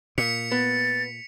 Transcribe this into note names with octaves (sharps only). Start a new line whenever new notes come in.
A#2 B6 C#7 F7
B3 A6